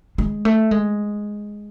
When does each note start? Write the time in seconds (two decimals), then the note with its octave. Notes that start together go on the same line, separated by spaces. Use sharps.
0.18 G#3
0.45 A3
0.71 G#3